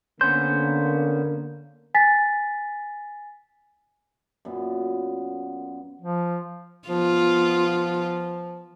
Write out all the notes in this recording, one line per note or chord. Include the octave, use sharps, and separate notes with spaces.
D3 A#3 B3 C#4 C5 G6
G#5 A6 B6
F#2 A#2 B3
F3
F3 B3 F4